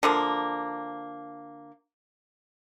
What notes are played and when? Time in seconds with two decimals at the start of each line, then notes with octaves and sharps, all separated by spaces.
0.03 D3 F3 A#3